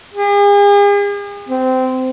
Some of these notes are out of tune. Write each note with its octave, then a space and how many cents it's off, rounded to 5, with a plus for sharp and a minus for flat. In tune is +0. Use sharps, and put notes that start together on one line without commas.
G#4 -45
C4 -20